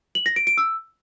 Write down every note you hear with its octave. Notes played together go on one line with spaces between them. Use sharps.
F#7
A#6
D7
D7
E6